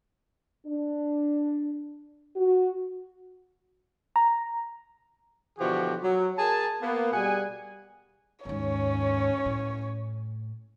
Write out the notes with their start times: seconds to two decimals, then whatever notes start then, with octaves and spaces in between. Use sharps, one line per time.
0.67 D4
2.36 F#4
4.16 A#5
5.59 B2 D3 E3 F3 F#4 G4
6.02 F#3
6.38 G#4 A#4 G#5 A5
6.81 A#3 B3
7.13 B2 G3 G#4 F#5 G#5
8.45 D#2 G#2 C#4 C#5
9.46 A2